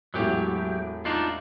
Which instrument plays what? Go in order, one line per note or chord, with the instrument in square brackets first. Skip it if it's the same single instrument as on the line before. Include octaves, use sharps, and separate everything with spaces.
[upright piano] E1 A2 [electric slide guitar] F#3 G4
[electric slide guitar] D4 D#4 F4